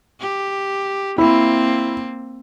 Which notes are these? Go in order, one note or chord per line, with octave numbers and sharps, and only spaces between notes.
G4
A#3 C4 E4